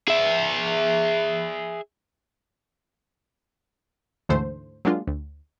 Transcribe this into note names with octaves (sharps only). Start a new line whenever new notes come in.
G#4 E5
D2 G#2 D3 E3 A3 C5
F#3 G#3 A#3 D4 F4
D2